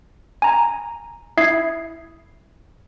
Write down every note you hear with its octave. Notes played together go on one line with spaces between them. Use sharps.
G#5 A#5
E4 E5 D#6 G#6 C7